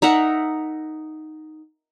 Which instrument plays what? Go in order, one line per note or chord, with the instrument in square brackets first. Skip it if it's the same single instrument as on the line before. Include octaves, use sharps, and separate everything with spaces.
[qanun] D#4 A#4 E5 F#5